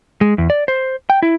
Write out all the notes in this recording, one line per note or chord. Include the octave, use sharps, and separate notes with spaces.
G#3
E2
D5
C5
G5
E4